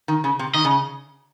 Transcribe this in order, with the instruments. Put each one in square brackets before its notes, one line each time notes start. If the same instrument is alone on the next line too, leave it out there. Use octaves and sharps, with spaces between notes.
[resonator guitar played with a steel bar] D#3
C#3
C3
[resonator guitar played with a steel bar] D#3 [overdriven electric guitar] D#5
[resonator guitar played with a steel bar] C#3